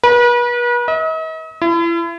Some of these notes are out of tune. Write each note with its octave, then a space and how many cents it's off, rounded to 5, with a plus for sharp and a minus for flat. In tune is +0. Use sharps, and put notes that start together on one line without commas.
B4 -40
D#5 +45
E4 +35